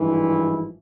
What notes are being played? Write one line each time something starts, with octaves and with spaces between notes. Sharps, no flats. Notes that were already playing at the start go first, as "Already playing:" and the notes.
Already playing: G#1 G2 E3 F3 G#3 E4